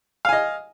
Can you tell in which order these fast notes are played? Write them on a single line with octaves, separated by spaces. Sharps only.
F5 G#5 D#5